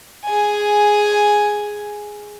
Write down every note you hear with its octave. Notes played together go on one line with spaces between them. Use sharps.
G#4 G#5